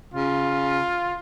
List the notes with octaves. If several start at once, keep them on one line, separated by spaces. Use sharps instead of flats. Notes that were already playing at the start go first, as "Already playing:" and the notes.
C#3 F4